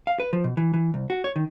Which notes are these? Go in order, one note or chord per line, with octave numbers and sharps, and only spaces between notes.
F5
B4
F3
B2
E3
E3
C2
F#4
C#5
D#3